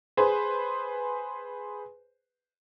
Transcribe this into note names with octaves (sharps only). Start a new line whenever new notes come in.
G#4 B4 C5